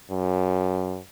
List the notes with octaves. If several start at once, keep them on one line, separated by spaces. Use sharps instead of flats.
F#2